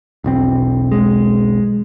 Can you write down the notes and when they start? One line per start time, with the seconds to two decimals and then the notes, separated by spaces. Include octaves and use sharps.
0.24 E1 B1 C4
0.92 G#3